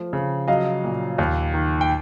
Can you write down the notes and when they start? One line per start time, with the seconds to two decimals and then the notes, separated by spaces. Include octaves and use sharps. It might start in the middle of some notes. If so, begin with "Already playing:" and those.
Already playing: F3 A3
0.13 C#3
0.48 F#3 D#5 F5
0.84 A#2
1.18 D#2
1.54 D#3
1.81 G5